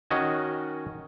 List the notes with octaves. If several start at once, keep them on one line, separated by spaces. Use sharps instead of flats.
D#3 C#4 F#4 D#5 G#5